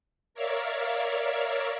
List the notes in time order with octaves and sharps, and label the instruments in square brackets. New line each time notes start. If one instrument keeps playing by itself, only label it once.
[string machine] A#4 C#5 D5 E5 F5